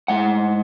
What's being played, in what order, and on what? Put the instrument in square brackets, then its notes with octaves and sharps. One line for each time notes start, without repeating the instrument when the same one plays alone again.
[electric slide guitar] G#2 G#3 F#5